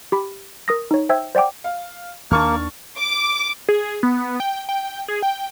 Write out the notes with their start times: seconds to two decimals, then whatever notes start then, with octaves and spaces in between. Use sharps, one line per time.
0.12 G4 B5
0.68 A#4 D#6 A#6
0.91 D#4 C#5
1.09 C5 E5 G5 E6 G#6
1.35 C5 D5 F#5 G5 D6
1.64 F5
2.31 D#2 D#3 A#3 D4 A5 C#6 F6
2.98 D6
3.69 G#4
4.03 B3
4.40 G5
4.69 G5
5.08 G#4
5.22 G5